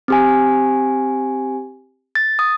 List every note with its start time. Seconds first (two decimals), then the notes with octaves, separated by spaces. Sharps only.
0.08 C4 G4 G#5
2.15 A6
2.39 D#6